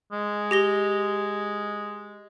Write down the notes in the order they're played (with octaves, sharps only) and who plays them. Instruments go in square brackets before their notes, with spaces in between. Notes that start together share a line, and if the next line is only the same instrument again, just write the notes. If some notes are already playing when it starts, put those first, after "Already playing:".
[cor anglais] G#3
[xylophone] G4 A#6 G7